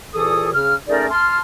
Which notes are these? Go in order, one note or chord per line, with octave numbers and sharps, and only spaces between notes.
C2 A#2 E3 G#4 A4 D#6
C#3 F6
A3 C#4 D#4 G#4 A#4 D5
A5 C6 F6